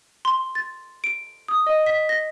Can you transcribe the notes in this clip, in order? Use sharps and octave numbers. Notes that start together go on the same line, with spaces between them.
C6
A6
D7
D#6
D#5
B6
A#6